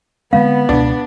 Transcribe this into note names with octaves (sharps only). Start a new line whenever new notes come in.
D3 G#3 B3 C4 F5
C#2 B2 D4